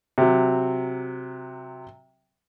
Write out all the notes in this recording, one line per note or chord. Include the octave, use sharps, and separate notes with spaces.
C3 F#3